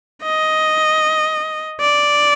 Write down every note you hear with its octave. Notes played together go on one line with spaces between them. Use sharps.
D#5
D5